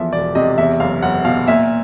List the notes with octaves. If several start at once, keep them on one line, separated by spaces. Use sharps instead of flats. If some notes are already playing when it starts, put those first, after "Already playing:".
Already playing: E2 E3 F3 E5
E1 D5
C3 D#5
E2 E5
F#1 F5
F#1 F#5
B2 F5
A#2 E5